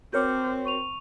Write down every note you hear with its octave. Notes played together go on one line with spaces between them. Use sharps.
C4 F#4 A#4 C#5 D6 F6 G6
C#6 D#7 F7